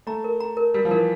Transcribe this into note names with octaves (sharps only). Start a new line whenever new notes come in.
A3 A#5
A#4
A#5
A#4
G3 A#4
F3
E3 A#4